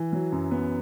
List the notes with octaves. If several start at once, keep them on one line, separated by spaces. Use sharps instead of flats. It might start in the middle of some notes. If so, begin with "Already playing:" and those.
Already playing: E3
F#3
F#2
B3